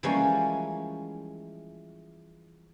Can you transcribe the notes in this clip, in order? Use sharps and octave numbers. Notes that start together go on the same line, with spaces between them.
E3 F3 G3 G#3 A#3 C#4